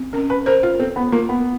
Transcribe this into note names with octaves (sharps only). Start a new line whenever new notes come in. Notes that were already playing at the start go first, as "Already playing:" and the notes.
Already playing: C4
C#4 A#4
B4
A#4 C5
F4
C4 A4
B3
A#3 F4
B3